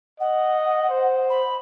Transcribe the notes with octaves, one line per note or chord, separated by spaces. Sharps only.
D#5 F#5
C5
B5